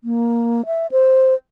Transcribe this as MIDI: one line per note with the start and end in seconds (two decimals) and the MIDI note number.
0.04 0.66 58
0.66 0.87 76
0.91 1.34 72